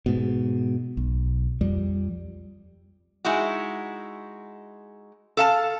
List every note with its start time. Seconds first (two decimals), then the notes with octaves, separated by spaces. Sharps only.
0.06 G#2 B2
0.97 B1
1.61 F2 G3
3.25 G#3 D#4 E4 F#4
5.37 A4 F5 A5